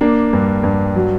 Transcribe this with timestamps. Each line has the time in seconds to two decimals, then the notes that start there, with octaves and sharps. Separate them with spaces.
0.01 A#3 D4
0.33 G2
0.64 G2
0.96 F#3